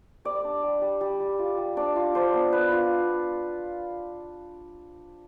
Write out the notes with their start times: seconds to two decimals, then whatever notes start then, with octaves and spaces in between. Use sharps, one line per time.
0.25 G3 D5
0.44 D4
0.63 G3
0.82 G3
1.01 G3
1.20 G3
1.39 F4
1.58 G3
1.77 D4 D5
1.96 F4
2.15 D4 C5
2.34 B3
2.53 B3 B4
2.72 F4